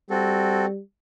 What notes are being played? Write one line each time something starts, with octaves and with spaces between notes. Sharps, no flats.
G3 C4 F#4 A4